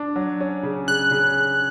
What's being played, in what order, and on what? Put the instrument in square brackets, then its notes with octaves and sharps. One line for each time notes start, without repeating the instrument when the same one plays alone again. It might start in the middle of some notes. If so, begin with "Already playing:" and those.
Already playing: [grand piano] D4
F#3
C#4
C#3
[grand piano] C#3 [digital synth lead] F#6
[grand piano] C#3